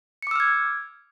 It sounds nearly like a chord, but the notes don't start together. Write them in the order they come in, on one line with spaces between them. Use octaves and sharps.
C#7 D6 E6 F6 G#6